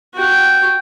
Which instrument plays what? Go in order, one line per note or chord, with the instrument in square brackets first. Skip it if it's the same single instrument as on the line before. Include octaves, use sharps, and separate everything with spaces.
[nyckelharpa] F#4 G5